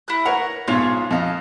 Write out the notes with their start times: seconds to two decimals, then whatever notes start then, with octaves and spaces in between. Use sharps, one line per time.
0.08 E4 F#6
0.26 A#4 B4 C#5 F#5
0.68 B1 G#2 F4 C#5
1.11 F2 A4 D#5 F5